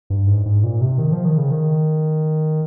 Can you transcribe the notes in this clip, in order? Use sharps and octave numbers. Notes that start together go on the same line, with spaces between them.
G2
G#2
G#2
A#2
C3
D#3
F3
D#3
C#3
D#3